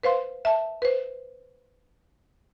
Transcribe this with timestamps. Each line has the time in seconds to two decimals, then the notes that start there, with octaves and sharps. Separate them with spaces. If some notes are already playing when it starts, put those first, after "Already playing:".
0.03 B4 C5 F5 C6
0.45 E5 A5
0.82 B4 C5